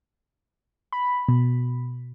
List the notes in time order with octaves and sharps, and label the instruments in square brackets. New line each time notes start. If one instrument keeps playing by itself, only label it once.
[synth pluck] B5
B2